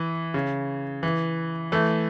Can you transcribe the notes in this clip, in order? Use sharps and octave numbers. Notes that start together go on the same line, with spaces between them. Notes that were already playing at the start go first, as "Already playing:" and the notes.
Already playing: E3
C#3
E3
E3 A3